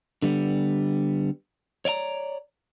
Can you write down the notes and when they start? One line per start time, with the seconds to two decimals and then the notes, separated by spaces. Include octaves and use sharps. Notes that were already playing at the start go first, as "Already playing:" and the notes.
0.22 D3 G3 B3
1.85 C#5 D5 E5 A#5